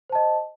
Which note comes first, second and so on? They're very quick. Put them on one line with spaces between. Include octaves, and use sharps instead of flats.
C5 A5 D#5